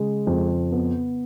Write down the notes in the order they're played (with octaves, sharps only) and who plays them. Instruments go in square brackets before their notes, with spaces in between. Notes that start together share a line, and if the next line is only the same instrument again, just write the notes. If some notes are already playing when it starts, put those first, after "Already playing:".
Already playing: [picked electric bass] C#3 [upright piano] G#3
[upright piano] F2
B3